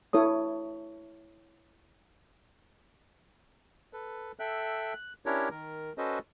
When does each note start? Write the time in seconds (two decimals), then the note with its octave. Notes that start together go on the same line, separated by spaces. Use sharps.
0.13 E4 A4 C#5 D#6
3.93 A4 B4
4.39 A4 E5 G5 F#6
4.94 F#6
5.26 C#4 D4 E4 G4 A#4 C#5
5.51 D#3 A#4
5.98 C#4 F#4 A4 B4 C5 D#5